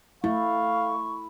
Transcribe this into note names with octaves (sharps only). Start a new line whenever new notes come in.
A3 E4 F5 C#6